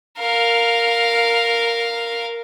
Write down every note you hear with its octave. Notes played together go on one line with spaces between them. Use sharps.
A#4 F5